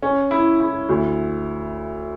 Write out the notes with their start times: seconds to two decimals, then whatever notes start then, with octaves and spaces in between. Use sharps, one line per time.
0.02 C#4
0.31 E4
0.60 E4
0.89 D2